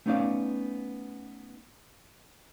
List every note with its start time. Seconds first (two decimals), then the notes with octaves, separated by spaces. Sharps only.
0.06 A3 B3 C#4 D#4 D5 F5